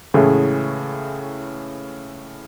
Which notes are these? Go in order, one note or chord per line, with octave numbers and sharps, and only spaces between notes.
A2 C#3 E3 G#3 A3 G#4